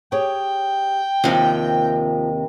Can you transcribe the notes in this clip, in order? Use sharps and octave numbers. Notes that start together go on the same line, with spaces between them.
G4 G#4 C#5 G5
D#2 C3 F3